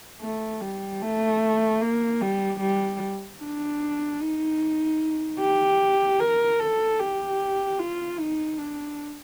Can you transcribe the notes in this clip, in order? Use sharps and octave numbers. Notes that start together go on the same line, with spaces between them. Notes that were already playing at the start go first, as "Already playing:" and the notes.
A3
G3
A3
A#3
G3
G3
D4
D#4
G4
A#4
A4
G4
F4
D#4
D4